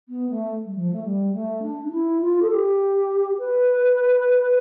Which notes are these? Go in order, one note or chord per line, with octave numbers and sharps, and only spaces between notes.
B3
A3
G3
F3
A3
G3
A3
D4
D4
E4
F4
A4
G4
B4